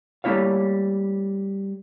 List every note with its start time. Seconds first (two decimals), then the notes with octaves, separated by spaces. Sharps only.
0.24 G3 A3 A#3 E4 C#5 F5